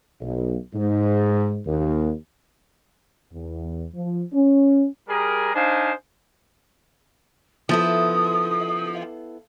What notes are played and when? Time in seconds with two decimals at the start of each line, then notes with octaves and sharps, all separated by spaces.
0.21 B1
0.74 G#2
1.66 D#2
3.32 E2
3.94 F3
4.32 C#4
5.09 G3 G#4 A#4
5.55 D4 D#4 C5 F5 G#5
7.69 F3 B3 E4 A4 D#6